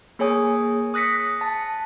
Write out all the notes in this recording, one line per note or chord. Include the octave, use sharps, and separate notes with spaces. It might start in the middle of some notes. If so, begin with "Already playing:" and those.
A#3 G#4 C#5 G#5 D#6
D#6 F#6 A#6 B6 C#7
A5